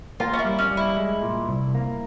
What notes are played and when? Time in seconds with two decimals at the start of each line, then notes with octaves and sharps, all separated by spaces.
0.20 A#3 F4
0.33 C#4
0.39 E4
0.45 G3
0.59 C#4
0.71 G3
0.77 E4
0.97 G#3
1.22 A#2
1.49 C2
1.75 A#3